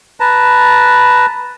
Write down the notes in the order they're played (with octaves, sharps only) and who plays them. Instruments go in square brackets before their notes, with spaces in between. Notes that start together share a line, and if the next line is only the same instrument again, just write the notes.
[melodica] B4 A5 A#5